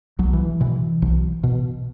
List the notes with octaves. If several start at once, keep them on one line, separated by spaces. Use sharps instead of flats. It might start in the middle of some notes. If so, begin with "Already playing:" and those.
B1 F#3
E3
B2 E3
B1
B2